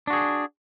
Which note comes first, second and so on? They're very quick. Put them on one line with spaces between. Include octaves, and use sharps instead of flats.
D4 F#4 G#4